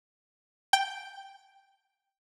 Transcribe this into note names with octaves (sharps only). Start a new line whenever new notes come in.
G5